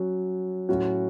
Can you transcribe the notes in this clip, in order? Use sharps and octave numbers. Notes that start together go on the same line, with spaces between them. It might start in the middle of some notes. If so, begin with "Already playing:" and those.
Already playing: F#3 C#4 F#4
A2 F#3 C#4 F#4